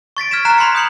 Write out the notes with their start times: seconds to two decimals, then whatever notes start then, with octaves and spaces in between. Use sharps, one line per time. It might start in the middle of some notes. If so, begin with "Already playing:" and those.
0.17 C#6 A6 B6 D7
0.31 F6 G#6 B6 D7 E7
0.45 A#5 F#6 C7 E7
0.58 B5 C6 G#6 C#7
0.75 D#6 G6 C#7 F#7